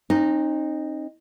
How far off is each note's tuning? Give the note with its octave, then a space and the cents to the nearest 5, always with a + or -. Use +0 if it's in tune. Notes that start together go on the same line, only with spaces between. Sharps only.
C4 +40 D#4 -10